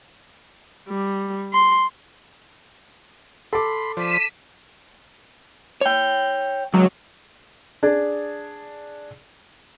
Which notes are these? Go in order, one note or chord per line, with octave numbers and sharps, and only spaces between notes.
G3
C6
A4 B5 C6 D6
F3 C5 D5 B6 D#7 E7
C#5 G5
C#2 F#3
D4 G#4